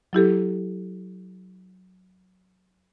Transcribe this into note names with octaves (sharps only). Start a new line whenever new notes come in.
F#3 E4 G4 A4